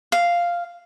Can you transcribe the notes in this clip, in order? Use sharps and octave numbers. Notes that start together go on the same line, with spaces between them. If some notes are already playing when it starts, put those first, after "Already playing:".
F5